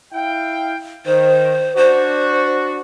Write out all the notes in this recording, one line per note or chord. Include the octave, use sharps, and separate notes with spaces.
E4 F5 G5
D#3 C5
D4 F#4 C5